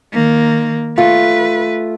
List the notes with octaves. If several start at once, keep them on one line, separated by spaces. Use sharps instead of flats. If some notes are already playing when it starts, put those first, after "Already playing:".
D#3 A#3
A3 F4 B4